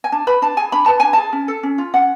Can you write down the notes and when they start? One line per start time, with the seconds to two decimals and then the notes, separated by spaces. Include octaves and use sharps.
0.04 G#5
0.12 D4 A5
0.27 B4 B5
0.42 D4 A5
0.57 G#4 G#5
0.72 D4 B5
0.86 B4 A5
1.00 D4 G#5
1.13 G#4 A5
1.33 C#4
1.48 A4
1.63 C#4
1.78 F4
1.94 C#4 F#5